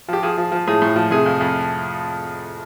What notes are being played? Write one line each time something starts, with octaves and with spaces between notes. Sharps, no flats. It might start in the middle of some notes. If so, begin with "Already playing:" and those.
F3 G4
F3 G#4
F3
F3
A2 G#4
A2
F3
C3 G#4
F2
F2